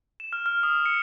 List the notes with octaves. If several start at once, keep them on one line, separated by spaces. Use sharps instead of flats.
E7
F6
F6
D#6
C#7